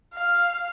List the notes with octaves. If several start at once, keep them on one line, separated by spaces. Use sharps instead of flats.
F5